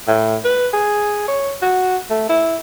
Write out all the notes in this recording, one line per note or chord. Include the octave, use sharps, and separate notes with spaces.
A2
B4
G#4
C#5
F#4
A3
E4